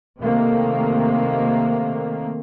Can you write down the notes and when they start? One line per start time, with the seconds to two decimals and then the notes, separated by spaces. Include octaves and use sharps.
0.21 C3 D#3 A3 A#3